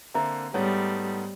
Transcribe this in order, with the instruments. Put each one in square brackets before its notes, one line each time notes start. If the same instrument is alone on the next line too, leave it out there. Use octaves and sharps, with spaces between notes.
[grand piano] D3 A#3 C4 [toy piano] E5 A#5
[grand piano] G#2 A3 B3 [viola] G3 [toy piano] C#5